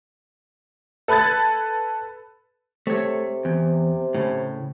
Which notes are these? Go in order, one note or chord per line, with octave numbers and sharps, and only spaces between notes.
A4 B4 B5 F#6 G#6 A6
C3 A3 C#5
E2
A2 C#3